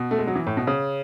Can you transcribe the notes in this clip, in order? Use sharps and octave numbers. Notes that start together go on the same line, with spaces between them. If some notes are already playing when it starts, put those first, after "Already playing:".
Already playing: B2
A3
G#3
F#3
E3
A2
B2
C#3